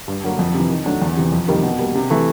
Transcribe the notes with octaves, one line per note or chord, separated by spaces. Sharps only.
G2
D3 F#3 A#3
F2
C3 E3
D#3
F#3 A3 D4
E2
C3 E3
F2
C3 D#3 G3 A#3
B2
G3 A#3
C3
E3 A3